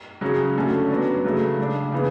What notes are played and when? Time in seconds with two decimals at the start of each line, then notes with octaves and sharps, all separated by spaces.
0.21 C#3 F#3 C#4 G#4
0.56 D3 A3 C#4 F#4 A4
0.90 F#3 B3 D4
1.24 C#3 F#3 A3
1.58 C#3 G#3 D4
1.92 C#3 E3 B3